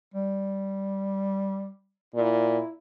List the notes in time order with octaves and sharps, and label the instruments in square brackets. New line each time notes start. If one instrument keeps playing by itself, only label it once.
[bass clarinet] G3
[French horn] A#2 [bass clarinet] E4